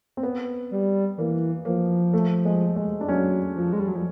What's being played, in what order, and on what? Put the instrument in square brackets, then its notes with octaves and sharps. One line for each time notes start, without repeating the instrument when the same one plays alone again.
[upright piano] C4
B3
[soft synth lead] G3
[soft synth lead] E3 [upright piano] A#3
[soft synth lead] F3 [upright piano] A#3
[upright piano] A3
G#3
G#3
D4
[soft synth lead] F#3 [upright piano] C#4
[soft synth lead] F3
G#3
G3
F#3
F3